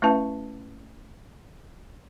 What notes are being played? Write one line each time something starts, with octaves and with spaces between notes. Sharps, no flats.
A3 C#4 E4 B4 E5 A5